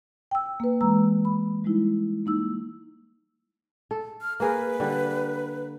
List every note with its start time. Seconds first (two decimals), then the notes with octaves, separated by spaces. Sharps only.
0.31 G5 E6
0.60 A#3 B4
0.81 E3 G#3 A#5 E6
1.25 B5
1.64 G3 G#3 D#4 E4
2.26 A#3 D#4 E6
3.91 A4
4.22 F6
4.40 A#3 G#4 A#4 B4
4.80 D3 G3